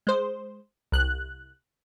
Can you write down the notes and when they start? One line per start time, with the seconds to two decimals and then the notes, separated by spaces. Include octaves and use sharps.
0.07 G#3 C5
0.92 C2 F#6